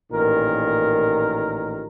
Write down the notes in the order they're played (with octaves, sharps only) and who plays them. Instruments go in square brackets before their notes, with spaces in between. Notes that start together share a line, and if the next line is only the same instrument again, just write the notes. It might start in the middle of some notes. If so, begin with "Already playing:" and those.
[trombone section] A1 A#2 D#3 A#4